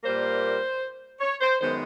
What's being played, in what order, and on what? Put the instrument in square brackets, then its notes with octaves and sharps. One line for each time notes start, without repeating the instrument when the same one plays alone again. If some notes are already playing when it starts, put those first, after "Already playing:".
[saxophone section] A#2 G3 A#3 C5
C#5
C5
F#2 D#3 G#3 B3 C5